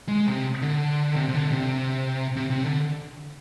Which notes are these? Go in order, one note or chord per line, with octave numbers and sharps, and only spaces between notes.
G#3
C3
D3
C3
C3
D3
C3
C3
C3
D3